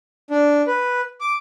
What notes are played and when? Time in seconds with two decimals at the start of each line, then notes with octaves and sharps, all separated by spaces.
0.31 D4
0.67 B4
1.21 D6